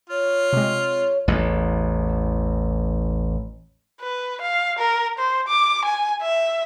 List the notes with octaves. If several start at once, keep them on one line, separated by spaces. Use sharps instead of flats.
F4 C#5
C3 G#3
A1 E2
B4
F5
A#4
C5
D6
G#5
E5